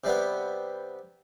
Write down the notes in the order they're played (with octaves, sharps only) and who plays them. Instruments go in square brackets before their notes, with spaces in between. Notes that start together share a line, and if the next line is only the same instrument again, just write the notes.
[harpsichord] C3 G3 B3